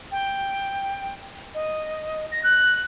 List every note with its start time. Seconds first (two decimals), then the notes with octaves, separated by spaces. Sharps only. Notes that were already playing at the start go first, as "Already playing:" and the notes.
0.12 G5
1.55 D#5
2.32 A#6
2.44 F#6